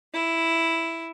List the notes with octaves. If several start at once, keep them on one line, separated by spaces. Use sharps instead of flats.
E4